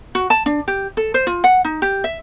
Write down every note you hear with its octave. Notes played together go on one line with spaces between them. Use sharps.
F#4
A5
D4
G4
A4
C5
F4
F#5
D#4
G4
E5